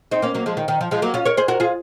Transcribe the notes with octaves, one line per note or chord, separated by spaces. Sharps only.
C4 D#4
A#3 C#4
F#3 A#3
F3 G#3
D#3
D#3
F3
F3 G#3
F#3 A#3
C#4 F4
A#4 C#5
G#4 C5
F#4 A#4
F4 G#4